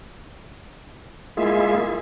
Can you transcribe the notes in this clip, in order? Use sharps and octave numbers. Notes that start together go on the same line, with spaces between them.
G#3 A#3 E4 F4 G#4 E5